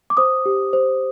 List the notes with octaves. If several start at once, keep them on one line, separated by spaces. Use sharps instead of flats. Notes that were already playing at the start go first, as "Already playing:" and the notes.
D6
C5 D#6
G4
C5